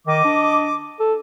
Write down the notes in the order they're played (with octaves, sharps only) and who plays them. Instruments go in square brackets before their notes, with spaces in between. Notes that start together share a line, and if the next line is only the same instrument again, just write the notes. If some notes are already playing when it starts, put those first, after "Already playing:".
[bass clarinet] D#3 [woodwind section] D#5 D6
[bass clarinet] D4
A4